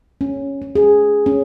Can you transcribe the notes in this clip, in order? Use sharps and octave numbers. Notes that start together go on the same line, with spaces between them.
C#4
C#4
G#4
C#4